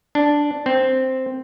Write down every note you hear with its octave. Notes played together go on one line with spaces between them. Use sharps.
D4
C4